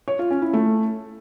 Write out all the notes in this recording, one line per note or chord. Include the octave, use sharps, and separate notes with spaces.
C#5
F4
C#4
E4
A3